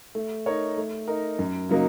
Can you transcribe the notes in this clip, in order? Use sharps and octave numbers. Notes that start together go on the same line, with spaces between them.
A3
D#4 A#4 C#5
A3
D#4 A#4
F#2
C#3 F#3 A#3 D#4